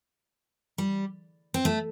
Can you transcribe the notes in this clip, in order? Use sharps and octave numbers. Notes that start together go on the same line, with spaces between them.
G3
C4
A3